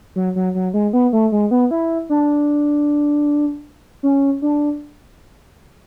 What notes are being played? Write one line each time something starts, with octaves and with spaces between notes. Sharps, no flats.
F#3
F#3
F#3
G#3
B3
A3
G#3
B3
E4
D4
C#4
D4